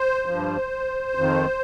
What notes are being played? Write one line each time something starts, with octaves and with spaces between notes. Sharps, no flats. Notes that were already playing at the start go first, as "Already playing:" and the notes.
Already playing: C5
G2 F3
F2 D#3